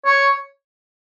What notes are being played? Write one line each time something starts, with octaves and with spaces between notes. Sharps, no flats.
C#5